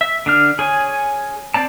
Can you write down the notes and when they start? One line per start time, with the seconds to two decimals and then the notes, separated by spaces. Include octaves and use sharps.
0.01 E5
0.26 D3 D4 F6
0.59 G#4 C#5 G#5
1.54 C4 D5 A5